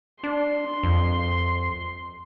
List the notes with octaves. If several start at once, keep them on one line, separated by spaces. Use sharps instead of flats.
D4 C6
F2